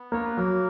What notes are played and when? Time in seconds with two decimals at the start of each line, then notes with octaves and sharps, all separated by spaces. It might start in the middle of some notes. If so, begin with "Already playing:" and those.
Already playing: B3
0.12 A#3 C#5
0.25 B4
0.37 F#3 A#3 A#4